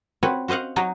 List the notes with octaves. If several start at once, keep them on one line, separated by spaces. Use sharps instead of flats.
C4 F#4 B4 C#5
F#4 C5 D#5 F5 F#5
F#3 D#4 F#4 C#5 D#5